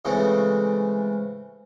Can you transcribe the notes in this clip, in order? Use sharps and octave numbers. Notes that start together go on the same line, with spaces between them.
C#3 E3 G#3 A3 C4